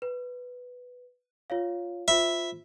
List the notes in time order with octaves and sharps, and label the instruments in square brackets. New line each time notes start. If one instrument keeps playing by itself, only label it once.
[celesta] B4
F4 C#5 F5
[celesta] F4 C5 B5 [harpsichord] E5